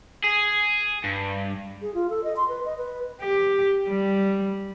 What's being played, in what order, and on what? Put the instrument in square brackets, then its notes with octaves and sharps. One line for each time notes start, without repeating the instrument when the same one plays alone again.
[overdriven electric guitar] G#4
G2
[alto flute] G#4
F4
A4
D#5
C6
B4
D#5
B4
[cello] G4
G3